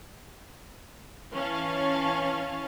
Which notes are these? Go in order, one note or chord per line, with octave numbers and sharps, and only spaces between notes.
E3 C#4 F5 A5